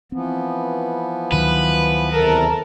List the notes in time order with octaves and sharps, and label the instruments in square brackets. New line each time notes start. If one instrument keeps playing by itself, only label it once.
[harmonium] E3 F3 B3 [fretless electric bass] C4
[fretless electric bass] D2 D#3 F#3 [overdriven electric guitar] B4
[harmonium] E2 C3 [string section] A4 A#4 A5